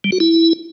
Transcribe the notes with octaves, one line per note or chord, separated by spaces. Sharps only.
G3
F#4
E4